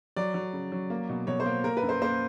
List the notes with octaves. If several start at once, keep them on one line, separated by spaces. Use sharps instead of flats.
F#3 D5
F#3
C#3
F#3
A#3
B2
B2 C#5
C5
A#3
A#3 A#4
B4
F#2
C5
A#3 C5